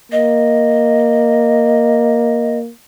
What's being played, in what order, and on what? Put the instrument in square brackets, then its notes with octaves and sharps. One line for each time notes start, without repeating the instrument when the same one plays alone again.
[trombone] A#3 [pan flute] D#5